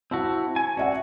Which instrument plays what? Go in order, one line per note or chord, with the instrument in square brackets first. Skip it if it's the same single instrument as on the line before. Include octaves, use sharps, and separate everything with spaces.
[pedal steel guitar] C4 E4 F#4 [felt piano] A5
[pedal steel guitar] G#5
[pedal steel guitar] F#4 [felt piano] D5 E5 F#5